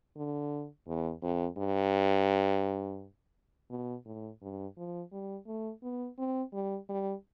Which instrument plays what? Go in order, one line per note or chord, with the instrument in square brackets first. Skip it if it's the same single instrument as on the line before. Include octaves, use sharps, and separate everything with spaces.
[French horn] D3
E2
F2
G2
B2
A2
G2
F3
G3
A3
B3
C4
G3
G3